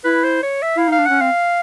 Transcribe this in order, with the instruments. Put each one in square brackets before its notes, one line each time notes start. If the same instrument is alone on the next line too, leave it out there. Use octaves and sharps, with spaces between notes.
[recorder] E4 [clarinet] B4
[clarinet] C5
C#5
E5
[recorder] E4 [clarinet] F5
[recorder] D#4 [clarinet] F5
[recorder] D4
[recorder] C#4 [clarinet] F#5
[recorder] C4 [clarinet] F5